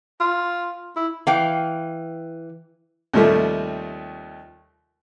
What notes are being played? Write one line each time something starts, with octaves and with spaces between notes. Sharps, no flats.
F4
E4
E3 F5 G5
D#2 C3 F3 G3 A3